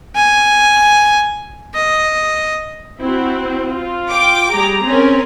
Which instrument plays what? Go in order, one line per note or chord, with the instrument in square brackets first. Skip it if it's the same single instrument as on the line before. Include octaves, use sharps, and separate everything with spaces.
[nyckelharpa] G#5
D#5
[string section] C4 [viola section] E4 F#4
[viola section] F4
[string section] G5 D6
[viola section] G3 G#4 A#5
[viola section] C4 [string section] C#4 A#4